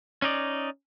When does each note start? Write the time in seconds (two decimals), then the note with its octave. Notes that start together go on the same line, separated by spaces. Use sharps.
0.22 C#4 D#4 D5